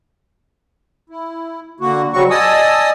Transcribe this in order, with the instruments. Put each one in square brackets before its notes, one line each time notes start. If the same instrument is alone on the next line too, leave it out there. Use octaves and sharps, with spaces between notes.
[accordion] E4
D3 A#3 F#4
C#3 F#3 G3 C4 F#4 C#6
D5 D#5 G#5 A5 D#6 E6